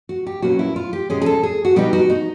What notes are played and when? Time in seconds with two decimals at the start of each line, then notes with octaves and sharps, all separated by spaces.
0.09 F#4
0.27 G4
0.42 B2 F#3 A#3 C#4 F#4
0.59 E4
0.76 F4
0.93 G4
1.10 B2 G#3 C#4 G#4
1.22 G#4
1.26 A4
1.43 G#4
1.65 F#4
1.76 B2 G3 B3 D#4 G4
1.93 F#4
2.10 D#4